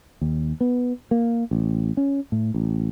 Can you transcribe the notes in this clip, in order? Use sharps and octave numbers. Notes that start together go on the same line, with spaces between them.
D#2
B3
A#3
A1
C#4
A2
A1